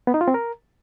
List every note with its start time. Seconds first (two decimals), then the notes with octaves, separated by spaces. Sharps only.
0.07 B3
0.14 D#4
0.21 F4
0.28 C4
0.34 A#4